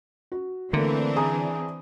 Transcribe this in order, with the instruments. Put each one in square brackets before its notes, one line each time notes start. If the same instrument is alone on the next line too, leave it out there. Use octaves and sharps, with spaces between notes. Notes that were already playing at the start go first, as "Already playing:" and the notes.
[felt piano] F#4
[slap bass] D3 [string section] E3 C4 D4 [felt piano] A3 A#3
[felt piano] G#4 A#5 D#6